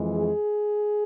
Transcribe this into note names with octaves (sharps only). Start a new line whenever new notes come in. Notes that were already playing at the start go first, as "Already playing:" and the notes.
Already playing: F2 E3 G#3
G#4